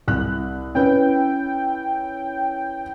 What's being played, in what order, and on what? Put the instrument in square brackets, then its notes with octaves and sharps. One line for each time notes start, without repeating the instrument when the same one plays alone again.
[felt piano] C2 F#6
[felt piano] C#4 E4 B4 [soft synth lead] G5